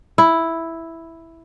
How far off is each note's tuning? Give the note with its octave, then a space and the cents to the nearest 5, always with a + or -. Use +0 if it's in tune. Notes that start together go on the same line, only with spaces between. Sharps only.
E4 +0